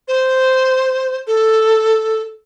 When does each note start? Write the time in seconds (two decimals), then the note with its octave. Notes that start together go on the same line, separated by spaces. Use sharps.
0.08 C5
1.27 A4